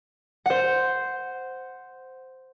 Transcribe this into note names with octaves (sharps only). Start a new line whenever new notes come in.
C5 F#5